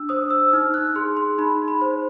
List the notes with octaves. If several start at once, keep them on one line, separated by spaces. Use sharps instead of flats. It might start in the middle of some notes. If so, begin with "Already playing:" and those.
Already playing: D4 E6
C5 D#6
E6
D#4 F6
F#6
G#4 C6
C6
D#4 B5
B5
C5